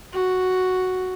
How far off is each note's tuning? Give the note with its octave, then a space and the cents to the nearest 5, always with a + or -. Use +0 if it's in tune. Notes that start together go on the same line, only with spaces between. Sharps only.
F#4 +0